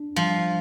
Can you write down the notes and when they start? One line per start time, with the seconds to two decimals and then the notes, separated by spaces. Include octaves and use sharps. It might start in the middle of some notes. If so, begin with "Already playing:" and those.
Already playing: D4
0.16 F3 G3